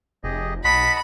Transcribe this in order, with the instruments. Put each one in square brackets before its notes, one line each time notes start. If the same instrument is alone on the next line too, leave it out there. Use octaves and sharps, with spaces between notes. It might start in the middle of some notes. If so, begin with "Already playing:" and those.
[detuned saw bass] F1 [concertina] G4 G#4 D#5
[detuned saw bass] B1 [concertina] D#5 F#5 A5 [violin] B5 [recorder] B6